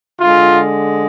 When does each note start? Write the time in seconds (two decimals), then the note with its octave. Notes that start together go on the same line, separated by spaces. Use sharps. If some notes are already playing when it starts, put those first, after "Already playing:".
0.20 D3 G#3 F4